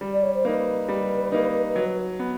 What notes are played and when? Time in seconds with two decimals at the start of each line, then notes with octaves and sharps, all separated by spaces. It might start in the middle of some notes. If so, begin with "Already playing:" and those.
0.01 G3
0.13 D5
0.23 C#5
0.35 C5
0.45 A#3 D#4 B4
0.89 G3
1.32 A#3 D#4
1.76 F#3
2.19 B3